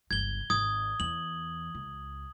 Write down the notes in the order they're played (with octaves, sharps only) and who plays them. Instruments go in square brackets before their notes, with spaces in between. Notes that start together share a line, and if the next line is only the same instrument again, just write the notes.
[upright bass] G1 C#2 [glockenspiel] G#6 G7
[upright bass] G#1 [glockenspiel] D#6 G#6
[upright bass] E2 [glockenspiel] F#7
[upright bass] C#2